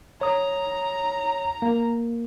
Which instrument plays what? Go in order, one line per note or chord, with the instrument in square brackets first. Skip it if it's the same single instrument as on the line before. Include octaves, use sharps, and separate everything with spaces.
[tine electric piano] C#5 D#6 [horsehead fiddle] A#5
[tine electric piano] A#3